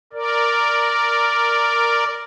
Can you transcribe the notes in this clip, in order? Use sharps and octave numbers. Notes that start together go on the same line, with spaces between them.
A#4 D5